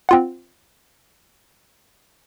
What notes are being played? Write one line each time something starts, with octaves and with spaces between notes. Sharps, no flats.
C4 F4 F#5